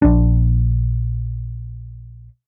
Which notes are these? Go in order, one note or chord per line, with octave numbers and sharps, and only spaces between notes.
A#1 D4